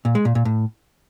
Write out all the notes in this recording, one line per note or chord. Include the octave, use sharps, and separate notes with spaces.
A#2
G#3
A#2
A#2
A2